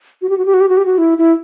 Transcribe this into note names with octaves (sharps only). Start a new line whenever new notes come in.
F#4
G4
F#4
G4
F#4
G4
F#4
G4
F#4
E4
E4